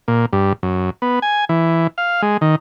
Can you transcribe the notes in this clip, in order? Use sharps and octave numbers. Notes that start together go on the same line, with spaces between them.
A#2
G2
F#2
B3
G#5
E3
F5
G#3
D#3